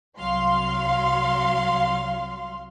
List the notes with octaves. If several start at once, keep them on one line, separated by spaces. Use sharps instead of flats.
C2 F#3 F5 C6